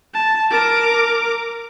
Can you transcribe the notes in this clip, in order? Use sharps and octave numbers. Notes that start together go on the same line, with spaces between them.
A5
A#4 D6